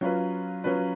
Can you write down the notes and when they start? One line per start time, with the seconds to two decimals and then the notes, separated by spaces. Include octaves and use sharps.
0.01 F#3 C#4 F4 B4
0.64 F#3 C#4 F4 B4